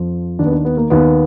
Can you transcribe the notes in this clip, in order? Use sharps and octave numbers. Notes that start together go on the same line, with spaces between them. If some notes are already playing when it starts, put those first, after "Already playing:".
Already playing: F2 F3
D#2 D#3 D4
B3
D4
B3
A#3
D#2 D#3 B3